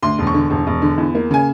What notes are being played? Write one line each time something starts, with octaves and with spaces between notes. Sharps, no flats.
D2 C6
E1
C#6
D3
E1
E1
D3
E2
A#3
C#3 G#5